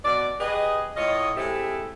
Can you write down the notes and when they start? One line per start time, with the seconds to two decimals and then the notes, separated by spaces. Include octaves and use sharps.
0.05 B2 D5
0.40 G4 G#4 B4 D#5
0.97 A2 F4 C#5 D#5
1.37 G#3 A3 C4 E4 G4